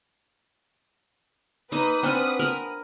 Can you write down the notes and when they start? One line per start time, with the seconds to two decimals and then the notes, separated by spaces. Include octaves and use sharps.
1.72 A#3 D#4 B4 D#6
2.03 C4 D4 F#5 G#5 F6
2.39 A#4 B5